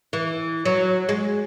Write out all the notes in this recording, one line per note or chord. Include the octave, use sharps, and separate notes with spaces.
E3
F#3
G#3